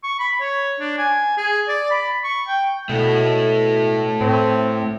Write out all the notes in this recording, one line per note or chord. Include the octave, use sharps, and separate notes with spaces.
C#6
B5
C#5
D4
G#5
G#4
D5
B5
C#6
G5
B2 A3 E4
A2 C4